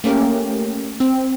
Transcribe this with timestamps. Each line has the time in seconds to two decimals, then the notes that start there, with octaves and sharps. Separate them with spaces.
0.04 A3 A#3 C#4 G4 A#4
1.00 C4